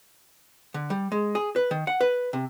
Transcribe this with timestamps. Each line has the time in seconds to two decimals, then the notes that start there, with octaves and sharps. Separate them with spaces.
0.74 D3
0.90 G3
1.12 G#3
1.35 G#4
1.56 B4
1.71 D#3
1.87 F#5
2.01 B4
2.33 C3